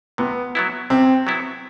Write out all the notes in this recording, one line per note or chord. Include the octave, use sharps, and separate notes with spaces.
C3 B3
F#3 B3 E4
C3 C4
F#3 B3 E4